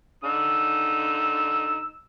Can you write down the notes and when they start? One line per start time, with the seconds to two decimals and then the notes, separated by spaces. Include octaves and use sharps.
0.24 D3 D#4 E6